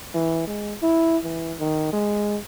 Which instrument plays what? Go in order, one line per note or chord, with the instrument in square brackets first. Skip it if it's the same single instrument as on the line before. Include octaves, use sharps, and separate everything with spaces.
[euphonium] E3
G#3
E4
E3
D#3
G#3